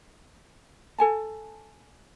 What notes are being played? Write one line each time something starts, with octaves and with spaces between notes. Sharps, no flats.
A4 G#5 A5